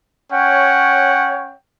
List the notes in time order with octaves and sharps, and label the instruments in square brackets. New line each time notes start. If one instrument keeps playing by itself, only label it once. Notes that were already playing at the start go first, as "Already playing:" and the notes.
[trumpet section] C#4 C#5 F#5 G5